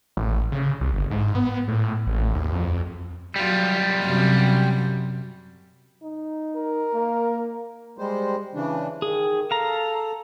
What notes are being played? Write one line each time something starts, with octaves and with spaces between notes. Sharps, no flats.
A1
C#3
C2
G1
G#2
B3
A2
A1
D#2
F2
F#3 G3 F4
F#2 C3
D#4
A#4
A#3
G3 G#3 C5
C#3 E3 D4
D#3 G#4
A4 F5 A#5